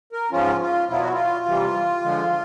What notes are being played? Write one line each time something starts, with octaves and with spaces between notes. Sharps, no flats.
A#4
G#2 F3 G#3 C#4 F4
F4
E2 B2 F#3 B3 E4 F4
F#4
F4
C3 E3 G3
D3 F3 G#3